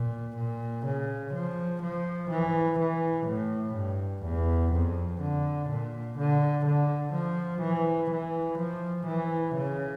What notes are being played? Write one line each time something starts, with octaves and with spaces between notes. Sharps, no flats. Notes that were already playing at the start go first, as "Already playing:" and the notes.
Already playing: A#2
A#2
C#3
F3
F3
E3
E3
A2
G2
E2
F2
D3
A#2
D3
D3
F3
E3
E3
F3
E3
C#3